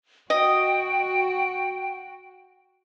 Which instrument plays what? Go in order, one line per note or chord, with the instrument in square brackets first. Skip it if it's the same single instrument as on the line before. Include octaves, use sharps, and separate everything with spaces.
[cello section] F#4 [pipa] D#5 [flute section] G5